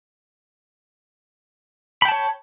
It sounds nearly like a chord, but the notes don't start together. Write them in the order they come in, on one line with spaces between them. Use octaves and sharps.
B5 G5 A5 C#5